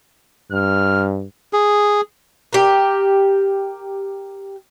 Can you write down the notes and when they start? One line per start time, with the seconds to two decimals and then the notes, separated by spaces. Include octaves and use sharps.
0.52 G2 F6
1.53 G#4
2.53 G4 A#4